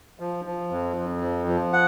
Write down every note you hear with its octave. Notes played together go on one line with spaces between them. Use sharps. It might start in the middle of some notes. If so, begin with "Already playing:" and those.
F3
F3
F2
F2
F3
F3
F#5